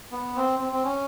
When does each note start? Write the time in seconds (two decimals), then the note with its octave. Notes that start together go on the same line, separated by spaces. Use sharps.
0.12 B3
0.36 C4
0.59 C4
0.73 C4
0.84 C#4